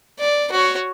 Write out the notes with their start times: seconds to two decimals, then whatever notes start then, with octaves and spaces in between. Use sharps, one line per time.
0.19 D5
0.52 F#4 C#5